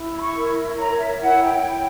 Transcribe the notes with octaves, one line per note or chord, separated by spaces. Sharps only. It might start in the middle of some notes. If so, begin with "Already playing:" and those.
Already playing: E4
B5
C#6
A#4
C#5 A#5
E5
E4 F#5
G5
E4